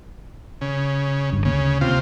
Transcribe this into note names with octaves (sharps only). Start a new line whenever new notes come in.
C#3
G1 G2
D2 C#3 A#3
C3 F4